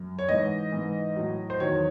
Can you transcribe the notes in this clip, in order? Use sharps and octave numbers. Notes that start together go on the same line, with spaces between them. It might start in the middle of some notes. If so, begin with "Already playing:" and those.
Already playing: F#2
C#5
G#2 E3 D#5
G#2 E3
A2 F#3
C5
E2 D#3 F#3 C#5